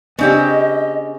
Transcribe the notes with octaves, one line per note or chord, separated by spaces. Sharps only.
C#3 B3 C4 D4 G4 D#5